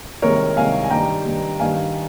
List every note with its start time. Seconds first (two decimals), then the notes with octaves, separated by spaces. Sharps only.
0.22 C2 C3 D#3 G#3 A#4 C#5
0.57 C2 C3 D#3 G#3 F5 G#5
0.84 G#5
0.90 G2 D#3 G3 G5 A#5
1.25 G2 D#3 G3
1.60 G2 D#3 G3 F5 G#5